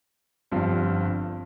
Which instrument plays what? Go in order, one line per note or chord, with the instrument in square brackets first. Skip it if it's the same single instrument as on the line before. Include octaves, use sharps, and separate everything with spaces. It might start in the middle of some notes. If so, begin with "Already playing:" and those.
[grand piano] G1 G2 F3 C4